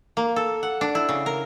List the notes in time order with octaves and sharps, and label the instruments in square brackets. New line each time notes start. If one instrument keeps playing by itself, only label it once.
[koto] A#3
A4
F#5
D4
E4
C#3
A#4